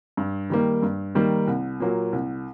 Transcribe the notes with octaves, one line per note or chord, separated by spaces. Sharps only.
G2
D#3 G3 A#3
G2
D#3 G3 A#3
C2
A#2 F#3 A#3
C2